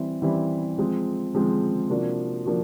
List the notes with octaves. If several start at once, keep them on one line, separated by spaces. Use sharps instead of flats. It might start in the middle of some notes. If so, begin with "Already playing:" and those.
Already playing: E3 G3 C4 E4
E3 G3 C4 E4
F3 G#3 C4
F3 G#3 C4
C3 F3 A#3 D4 F#4
F3 A#3 D4 F#4